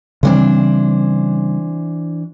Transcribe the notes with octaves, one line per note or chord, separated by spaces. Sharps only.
C#3 E3 G3 C4 D4 C5